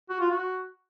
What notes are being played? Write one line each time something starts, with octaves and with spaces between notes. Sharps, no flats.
F#4
F4
F#4